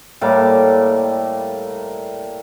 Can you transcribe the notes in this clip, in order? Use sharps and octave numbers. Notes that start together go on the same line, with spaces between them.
A2 G3 A#3 D6